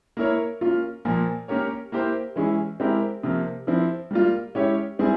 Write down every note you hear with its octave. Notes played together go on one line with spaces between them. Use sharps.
A#3 E4 A#4 C#5
A#3 C#4 F4
A#2 F3 A#3
A#3 C#4 G4 A#4 C#5
A#3 E4 G4 C5
E3 G#3 C#4 E4 G#4
G#3 C4 E4 G4 A#4
C3 F3 A#3
F3 C4 E4
G3 A#3 F4
G#3 C#4 E4 G4 C#5
G3 C4 E4 G#4